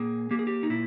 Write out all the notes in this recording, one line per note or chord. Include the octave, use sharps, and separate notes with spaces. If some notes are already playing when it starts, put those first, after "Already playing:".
Already playing: A#2 A#3 G#4
A#3 G4
G#4
G4
D#4
A#2 E4